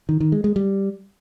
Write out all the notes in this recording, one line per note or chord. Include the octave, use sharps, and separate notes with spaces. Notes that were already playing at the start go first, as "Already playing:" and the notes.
D#3
D#3
G#3
G#3
G3